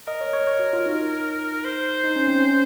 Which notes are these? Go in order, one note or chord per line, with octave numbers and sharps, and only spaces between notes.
A#4 D#5
C#5
C#5
C#5
F#4
F4
D#4
C5
D#4
C#4
C4
C#4